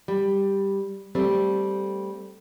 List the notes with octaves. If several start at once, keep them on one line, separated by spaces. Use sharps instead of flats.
G3
G3 A3 C4